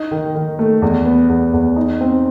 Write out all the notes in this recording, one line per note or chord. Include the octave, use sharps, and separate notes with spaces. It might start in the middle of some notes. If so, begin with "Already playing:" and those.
Already playing: D#4
D#3
D#3
A3
E2
B3
E2
E2
D#4
C4